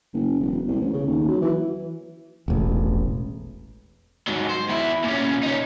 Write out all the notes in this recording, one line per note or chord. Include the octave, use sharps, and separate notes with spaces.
F#1
E1
C2
A1
C#3
D#2
F#3
E3
E1 A1
G#2 F#3
C5
E2 E4
A#2 C#4
C#4 D#4